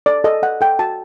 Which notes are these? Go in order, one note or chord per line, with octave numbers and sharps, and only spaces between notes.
A4 D5
A4 D#5
A4 F#5
A4 G5
F#4 A5